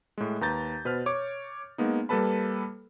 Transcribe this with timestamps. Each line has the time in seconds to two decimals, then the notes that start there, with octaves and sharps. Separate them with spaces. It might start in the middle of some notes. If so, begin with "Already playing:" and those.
0.18 A2 G#3
0.41 D#2 B4 A#5 G6 A6
0.85 B2 B4 C5 F6
1.06 C#5 D6
1.78 G#3 A#3 B3 D#4
2.09 G3 A#3 A4 B4 A5 B5